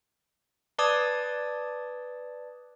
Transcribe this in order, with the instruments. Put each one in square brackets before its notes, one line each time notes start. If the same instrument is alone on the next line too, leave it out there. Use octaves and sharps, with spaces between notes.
[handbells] B4 D5 A5 D6 D#6 G#6